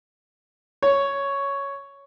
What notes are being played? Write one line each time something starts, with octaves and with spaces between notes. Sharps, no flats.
C#5